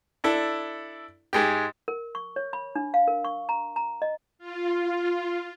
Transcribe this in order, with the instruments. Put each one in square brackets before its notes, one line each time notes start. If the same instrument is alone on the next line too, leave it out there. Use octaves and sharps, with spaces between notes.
[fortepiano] D4 E4 A4
G#2 G#3 G4
[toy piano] A#4
C#6
C#5
B5
D4
F5
A#4
C#6
A#5
A#5
D#5
[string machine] F4